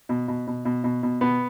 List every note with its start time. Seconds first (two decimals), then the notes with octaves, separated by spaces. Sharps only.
0.09 B2
0.28 B2
0.47 B2
0.65 B2
0.84 B2
1.03 B2
1.21 B2 B3